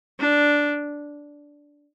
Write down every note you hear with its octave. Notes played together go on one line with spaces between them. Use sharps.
D4